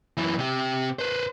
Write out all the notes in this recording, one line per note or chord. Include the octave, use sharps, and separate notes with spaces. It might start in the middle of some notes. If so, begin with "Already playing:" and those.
F#2 E3
C3 G4
B4 C5